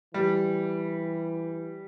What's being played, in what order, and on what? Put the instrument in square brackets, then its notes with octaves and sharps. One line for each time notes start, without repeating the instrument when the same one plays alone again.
[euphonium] E3 [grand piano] G3